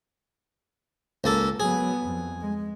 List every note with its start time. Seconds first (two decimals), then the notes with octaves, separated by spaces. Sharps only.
1.24 C#2 A#3 A4
1.60 F#3 B3 G#4
2.04 F2
2.41 G#3